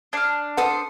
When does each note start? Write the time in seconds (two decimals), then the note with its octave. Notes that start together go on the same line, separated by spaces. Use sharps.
0.13 D4 F6 G#6 C7 D#7
0.57 A4 B4 C5 F#5 D#6